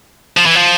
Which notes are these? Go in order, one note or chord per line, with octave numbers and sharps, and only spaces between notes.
F3
E3
F3